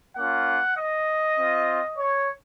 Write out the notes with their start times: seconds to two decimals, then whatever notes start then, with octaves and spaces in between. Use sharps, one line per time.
0.17 A#3 C#4 F4 F#5
0.78 D#5
1.37 C4 F4
1.98 C#5